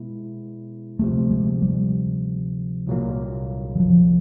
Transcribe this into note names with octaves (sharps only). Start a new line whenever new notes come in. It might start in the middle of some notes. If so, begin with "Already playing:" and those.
Already playing: B2 G#3 B3 E4
D2 C3 F3 A3
G#3
G3
C2 A#2 F#3 A#3
E3
F3